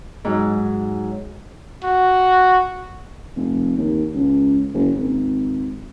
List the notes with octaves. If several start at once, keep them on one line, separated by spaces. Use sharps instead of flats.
G#2 F#3
F#4
F1
D#2
C#2
F#1
G#1